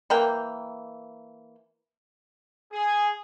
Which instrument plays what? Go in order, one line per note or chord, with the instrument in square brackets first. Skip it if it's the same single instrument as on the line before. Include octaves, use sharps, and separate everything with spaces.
[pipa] E3 A#3 G5
[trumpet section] G#4